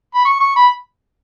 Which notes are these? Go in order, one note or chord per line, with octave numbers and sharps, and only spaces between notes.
B5
C#6
C#6
B5